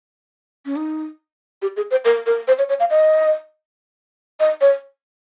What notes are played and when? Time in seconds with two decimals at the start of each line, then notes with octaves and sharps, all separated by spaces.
0.66 C#4
0.76 D#4
1.62 G4
1.77 G#4
1.91 C5
2.05 A#4
2.26 A#4
2.48 C5
2.58 C#5
2.69 C#5
2.80 F5
2.90 D#5
4.40 D#5
4.61 C#5